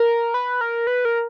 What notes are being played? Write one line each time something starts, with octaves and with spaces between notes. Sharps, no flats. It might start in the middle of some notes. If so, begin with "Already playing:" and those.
Already playing: A#4
B4
A#4
B4
A#4